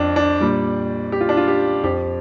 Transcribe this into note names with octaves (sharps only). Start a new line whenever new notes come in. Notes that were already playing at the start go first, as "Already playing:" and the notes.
Already playing: F2 D4
D4
A#2 G3
G4
F4
D4
F4
G4
F2 F3 G4